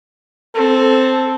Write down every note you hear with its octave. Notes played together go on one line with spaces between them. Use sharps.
C4 A4